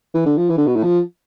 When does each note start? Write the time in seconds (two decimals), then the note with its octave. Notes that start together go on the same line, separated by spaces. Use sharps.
0.14 E3
0.25 D3
0.38 F3
0.49 E3
0.57 D3
0.66 B2
0.76 A2
0.83 F3